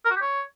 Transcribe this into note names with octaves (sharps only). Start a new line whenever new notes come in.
A#4
F#4
G4
C#5